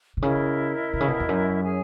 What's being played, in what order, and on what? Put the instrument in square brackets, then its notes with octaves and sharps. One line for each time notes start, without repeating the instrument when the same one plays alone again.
[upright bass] B2
[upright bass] C#3 [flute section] E4 A#4 D#5
[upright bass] B2
C#3
B2
E2
F#2
[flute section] G#4 C#5 G#5